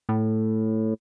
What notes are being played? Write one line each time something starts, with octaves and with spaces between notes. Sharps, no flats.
A2